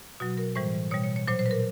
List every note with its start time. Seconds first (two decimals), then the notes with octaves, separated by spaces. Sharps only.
0.20 B2 F#3 F#4
0.38 A#4
0.55 A2 E3 G3 C5
0.91 B2 G3 C#5
1.04 C#5
1.16 C#5
1.27 A#2 F#3 C5
1.39 C5
1.46 B4
1.51 A#4